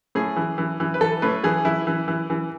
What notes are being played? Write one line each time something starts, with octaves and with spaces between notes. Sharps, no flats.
A2 G#4
E3
E3
E3
B4
E3 A4
A2 B4
E3 G#4
E3 E4
E3
E3
E3